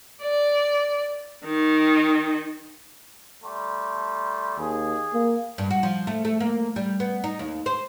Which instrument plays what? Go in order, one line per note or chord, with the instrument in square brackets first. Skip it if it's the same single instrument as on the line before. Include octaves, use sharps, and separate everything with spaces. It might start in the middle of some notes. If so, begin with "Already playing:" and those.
[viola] D5
D#3
[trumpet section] G3 A3 C6
[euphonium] D#2 [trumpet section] G#4
[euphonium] A#3
[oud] G2
F#4
F3
A3
A3
A#3
G3
B3
D#4
D#2
C5